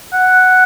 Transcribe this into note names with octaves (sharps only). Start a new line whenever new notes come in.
F#5